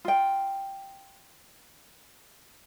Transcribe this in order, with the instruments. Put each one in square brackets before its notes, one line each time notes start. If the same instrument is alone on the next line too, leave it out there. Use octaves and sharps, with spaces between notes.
[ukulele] F4 G5